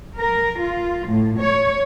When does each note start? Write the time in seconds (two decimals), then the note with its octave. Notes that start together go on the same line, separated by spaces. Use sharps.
0.17 A#4
0.61 F4
1.08 A2
1.41 C#5